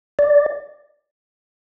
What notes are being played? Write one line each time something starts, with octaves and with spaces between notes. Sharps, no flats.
D5